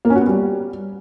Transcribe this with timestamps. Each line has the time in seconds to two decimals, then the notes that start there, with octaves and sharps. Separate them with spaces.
0.05 A#3
0.10 C#4
0.16 F#4
0.21 B3
0.27 G3